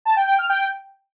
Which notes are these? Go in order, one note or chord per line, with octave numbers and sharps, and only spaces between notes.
A5
G5
G5
F6
G5